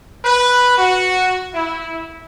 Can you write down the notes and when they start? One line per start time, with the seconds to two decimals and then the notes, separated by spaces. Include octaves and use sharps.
0.24 B4
0.77 F#4
1.54 E4